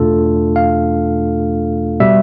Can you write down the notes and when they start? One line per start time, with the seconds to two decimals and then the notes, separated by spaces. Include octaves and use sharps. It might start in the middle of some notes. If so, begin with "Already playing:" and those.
Already playing: E2 B2 A3 D4 F4 A4
0.56 F5
2.00 B2 G3 E5